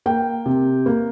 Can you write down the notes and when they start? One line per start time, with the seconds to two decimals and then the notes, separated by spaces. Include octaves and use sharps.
0.06 A#3 G5
0.46 C3
0.86 A#3